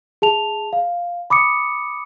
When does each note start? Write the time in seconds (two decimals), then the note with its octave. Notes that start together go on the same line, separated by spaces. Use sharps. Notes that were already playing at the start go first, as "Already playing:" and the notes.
0.22 G#4 A5 F7
0.73 F5
1.30 B5 D6 D#6 C#7